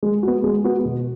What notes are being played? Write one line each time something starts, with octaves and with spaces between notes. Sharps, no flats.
G#3
B3 F#4
G#3
B3 F#4
B2